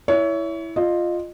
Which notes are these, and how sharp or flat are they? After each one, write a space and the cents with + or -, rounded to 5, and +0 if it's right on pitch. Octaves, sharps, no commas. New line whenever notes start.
E4 +0 C#5 +25 E5 +0
F4 +0 D#5 -25